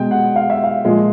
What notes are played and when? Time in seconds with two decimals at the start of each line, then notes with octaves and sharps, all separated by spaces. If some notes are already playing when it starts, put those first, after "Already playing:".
Already playing: B2 G#3 G5
0.11 F#5
0.36 F5
0.50 E5
0.64 F5
0.85 A#2 F3 G#3